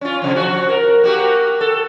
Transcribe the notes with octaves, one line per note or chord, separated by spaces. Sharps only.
C#4 F4
C3 F3
F3 F#4
A#4
A#3 F#4 G4
A4